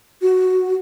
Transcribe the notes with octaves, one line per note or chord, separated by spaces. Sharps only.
F#4